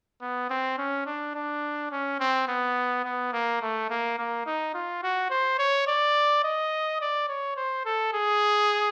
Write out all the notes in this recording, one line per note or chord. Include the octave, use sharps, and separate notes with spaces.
B3
C4
C#4
D4
D4
C#4
C4
B3
B3
A#3
A3
A#3
A#3
D#4
F4
F#4
C5
C#5
D5
D#5
D5
C#5
C5
A4
G#4